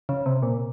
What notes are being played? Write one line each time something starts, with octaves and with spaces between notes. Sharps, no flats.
C#3
C3
A#2